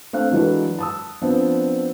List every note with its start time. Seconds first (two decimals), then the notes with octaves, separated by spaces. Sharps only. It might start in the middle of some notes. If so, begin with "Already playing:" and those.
0.13 A3 C4 D4 F5 F#6
0.32 E3 F#3 G#3 D4 A4 B4
0.79 A5 D#6 E6
1.21 F3 B3 C4 D4